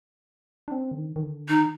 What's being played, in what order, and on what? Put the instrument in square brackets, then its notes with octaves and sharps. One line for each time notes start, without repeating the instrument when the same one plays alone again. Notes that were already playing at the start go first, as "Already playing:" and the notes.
[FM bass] D4
C4
D3
D#3
D#3
D3
[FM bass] D#3 [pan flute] D#4